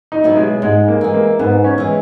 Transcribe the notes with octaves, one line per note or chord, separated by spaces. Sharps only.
D#4
B2 F#3 B3 E4
G#3
G#2 G#3
A#3
E3 G#3
A#3
G#2 B3
C#4
E3 G#3